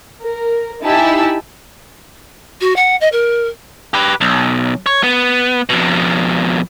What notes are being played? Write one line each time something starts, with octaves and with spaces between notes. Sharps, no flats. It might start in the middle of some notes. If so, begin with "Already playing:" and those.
A#4
D#4 E4 G4 G#5 A5 E6
F#4
F#5
D#5
A#4
G4 B4
B1
C#5
B3
F2 B2